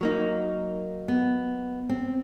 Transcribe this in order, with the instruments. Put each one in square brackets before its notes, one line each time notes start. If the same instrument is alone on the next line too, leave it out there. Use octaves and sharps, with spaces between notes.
[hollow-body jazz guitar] F#3 A#3 D#4
[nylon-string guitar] B3
C4